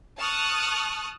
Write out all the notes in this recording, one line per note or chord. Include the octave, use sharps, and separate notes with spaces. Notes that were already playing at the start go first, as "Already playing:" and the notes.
A5 C#6 D#6 F6 F#6